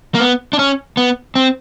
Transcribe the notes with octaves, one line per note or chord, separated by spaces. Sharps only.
A#3
B3
D4
C#4
B3
C4